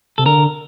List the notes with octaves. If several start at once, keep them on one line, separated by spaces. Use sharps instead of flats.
C3 A4
D3 A#4